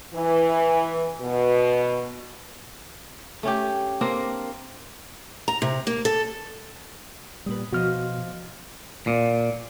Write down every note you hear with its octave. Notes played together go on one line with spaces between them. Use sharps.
E3
B2
A3 C#4 G4
A#3 C4 D4 A#4
A#5
C3
A#3
A4
A#2 G3 B4 D#6
B2 F3 F#4 C5 D#5 F6
A#2